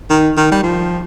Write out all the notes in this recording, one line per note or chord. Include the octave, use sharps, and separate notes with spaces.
D#3
D#3
G3
F3